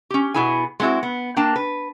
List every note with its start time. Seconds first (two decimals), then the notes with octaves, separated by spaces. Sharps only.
0.10 C#4 G4
0.34 B2 B3 E4 G#4 G#5
0.80 G#3 B3 C4 E4 F#4
1.03 B3
1.36 A#3 D4 G5 A5
1.56 B4